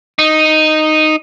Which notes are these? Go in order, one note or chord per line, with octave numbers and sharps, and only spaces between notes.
D#4